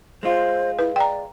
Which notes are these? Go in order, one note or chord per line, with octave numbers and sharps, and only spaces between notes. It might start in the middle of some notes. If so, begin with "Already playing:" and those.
G#3 F4 C5
E4 B4
D5 G5 A#5